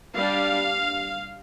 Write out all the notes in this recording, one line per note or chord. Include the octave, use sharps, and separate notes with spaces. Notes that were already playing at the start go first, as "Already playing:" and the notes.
G3 D4 F5